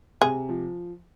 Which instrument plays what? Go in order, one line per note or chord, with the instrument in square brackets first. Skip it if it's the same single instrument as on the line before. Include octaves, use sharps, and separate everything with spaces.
[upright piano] C3 [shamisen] G#4
[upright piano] F3